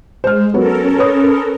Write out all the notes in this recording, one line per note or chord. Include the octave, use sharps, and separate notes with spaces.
G#3 C5 F6
F#3 B3 C#4 F#4 A4 A#4
B4 C#5 D#6